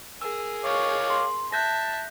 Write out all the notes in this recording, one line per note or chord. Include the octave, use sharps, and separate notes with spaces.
G#4 A#4 E6
C#5 F5 C#6 D6
C6
E5 A5 F#6 G6 A#6